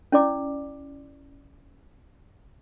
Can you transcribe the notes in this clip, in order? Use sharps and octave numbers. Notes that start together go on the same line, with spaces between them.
C#4 E4 D5 D6